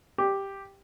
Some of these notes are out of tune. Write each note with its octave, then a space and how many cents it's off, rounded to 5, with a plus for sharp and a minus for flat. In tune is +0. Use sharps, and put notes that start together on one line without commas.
G4 +0